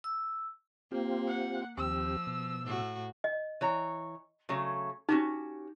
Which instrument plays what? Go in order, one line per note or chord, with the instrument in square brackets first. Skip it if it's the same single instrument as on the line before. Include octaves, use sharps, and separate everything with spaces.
[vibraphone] E6
[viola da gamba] A#3 [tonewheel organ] C4 F4 G4
[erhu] F#5
[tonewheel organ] D#2 C4 G4 [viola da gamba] F3 [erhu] E6
[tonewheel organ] B2
[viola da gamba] A2 F#4
[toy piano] D#5
[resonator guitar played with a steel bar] E3 C#5 A#5
C#3 F#3 A3
[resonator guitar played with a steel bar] C#4 F#4 G4 [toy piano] D#4